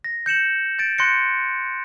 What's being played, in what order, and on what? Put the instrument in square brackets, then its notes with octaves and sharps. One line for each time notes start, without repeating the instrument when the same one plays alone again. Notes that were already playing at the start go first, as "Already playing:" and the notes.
[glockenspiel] A#6
G6 C#7 E7 F#7
G6 A6 D7
C6 F#6 G6 A#6 C#7